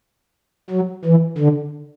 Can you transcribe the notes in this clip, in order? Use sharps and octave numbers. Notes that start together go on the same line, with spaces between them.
F#3
E3
D3